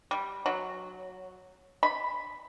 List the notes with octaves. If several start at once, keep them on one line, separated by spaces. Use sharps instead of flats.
G3
F#3
B5